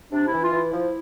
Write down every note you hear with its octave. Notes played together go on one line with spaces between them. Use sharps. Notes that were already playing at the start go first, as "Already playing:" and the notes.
C3 D4
E4
E3
F4
E3
E4
F3